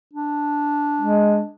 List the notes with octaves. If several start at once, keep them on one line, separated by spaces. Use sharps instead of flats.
D4
G#3